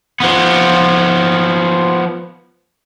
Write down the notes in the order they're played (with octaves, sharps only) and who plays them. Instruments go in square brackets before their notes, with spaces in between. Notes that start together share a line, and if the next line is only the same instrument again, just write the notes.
[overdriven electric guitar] F3 B3